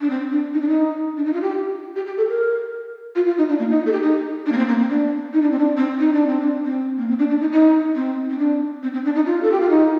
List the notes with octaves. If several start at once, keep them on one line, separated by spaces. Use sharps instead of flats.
D4
C4
D4
D#4
D4
D#4
D4
D#4
F4
G4
G4
G4
A4
A#4
F4
F4
D#4
D4
A#3
D#4
A4
G4
D#4
D4
A#3
C4
A#3
C4
D4
D#4
D4
C4
D4
C4
D#4
D4
C4
D4
C4
A#3
C4
D4
D4
D#4
D#4
C4
C4
D4
C4
C4
D4
D#4
F4
A4
G4
F4
D#4